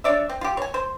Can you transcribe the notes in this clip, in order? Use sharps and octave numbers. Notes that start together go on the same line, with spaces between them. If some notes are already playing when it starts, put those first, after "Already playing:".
D4 C#5 D5 E5
C4
F4 G4
C#5 G#5
C5